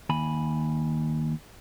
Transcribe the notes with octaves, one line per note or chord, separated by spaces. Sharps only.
D#2 G#5 B5